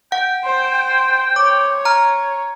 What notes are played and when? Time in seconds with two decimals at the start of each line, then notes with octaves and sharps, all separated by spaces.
0.12 F#5 G5
0.44 C5
1.36 C#5 D6
1.85 A#5 F6